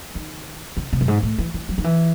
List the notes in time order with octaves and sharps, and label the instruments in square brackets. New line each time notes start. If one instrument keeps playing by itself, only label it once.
[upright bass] D#3
C#3
C3
F#2
G#2
A2
E3
E3
F#3
D#3
E3